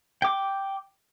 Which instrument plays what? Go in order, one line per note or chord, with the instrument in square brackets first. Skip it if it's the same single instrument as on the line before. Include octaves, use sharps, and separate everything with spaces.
[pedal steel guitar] G5 D6